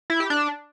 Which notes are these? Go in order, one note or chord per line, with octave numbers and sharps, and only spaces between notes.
E4
G4
D4